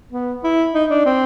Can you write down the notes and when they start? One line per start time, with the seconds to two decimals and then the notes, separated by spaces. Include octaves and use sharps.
0.12 B3
0.44 E4
0.74 D#4
0.90 D4
1.06 C4